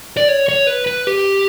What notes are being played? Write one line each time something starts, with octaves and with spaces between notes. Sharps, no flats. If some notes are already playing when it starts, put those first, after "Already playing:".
D5
C#5
C#5
B4
B4
G4